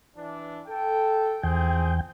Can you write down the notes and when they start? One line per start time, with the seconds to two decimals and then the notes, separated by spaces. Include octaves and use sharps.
0.16 E3 D4
0.67 A4 G5
1.43 E2 F3 C4 G#4 G5